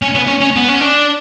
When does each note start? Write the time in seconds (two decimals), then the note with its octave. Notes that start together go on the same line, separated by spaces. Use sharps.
0.02 C#4
0.15 B3
0.27 C#4
0.41 C#4
0.56 B3
0.69 C#4
0.80 D4